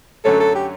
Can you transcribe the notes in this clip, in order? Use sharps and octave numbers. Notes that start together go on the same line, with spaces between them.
F#2 D3 F#3 A3 C#4 A4
A4
G4